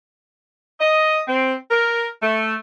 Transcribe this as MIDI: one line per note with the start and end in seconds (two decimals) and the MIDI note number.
0.80 1.21 75
1.28 1.54 60
1.71 2.07 70
2.23 2.55 57